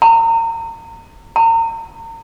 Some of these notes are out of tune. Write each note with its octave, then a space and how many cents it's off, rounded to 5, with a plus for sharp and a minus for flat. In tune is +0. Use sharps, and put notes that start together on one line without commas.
A#5 -30
A#5 -35